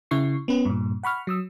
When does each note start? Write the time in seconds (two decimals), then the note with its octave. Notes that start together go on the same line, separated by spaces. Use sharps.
0.11 C#3 E4 C#6 C7
0.48 B3 C#4 B4
0.65 G2 A#2
1.03 F#5 B5 C#6 F6
1.27 F#3 D#6 E6